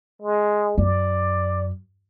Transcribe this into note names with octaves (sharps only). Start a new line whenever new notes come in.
G#3
F#2 D5